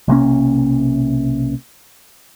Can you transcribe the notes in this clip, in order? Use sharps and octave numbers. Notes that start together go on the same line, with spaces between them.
B1 C3 A#3 C#4